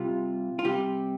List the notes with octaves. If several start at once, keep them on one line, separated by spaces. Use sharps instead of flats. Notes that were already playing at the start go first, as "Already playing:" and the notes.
Already playing: C3 G3 F4
F4
C3 G3 G4